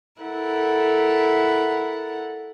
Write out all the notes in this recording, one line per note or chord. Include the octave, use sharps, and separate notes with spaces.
E4 A4 A#4 F#5